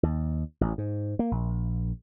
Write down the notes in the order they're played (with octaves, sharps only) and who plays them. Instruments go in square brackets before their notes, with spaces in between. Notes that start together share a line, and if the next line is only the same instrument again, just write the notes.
[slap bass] D#2
A1
G#2
A#3
A#1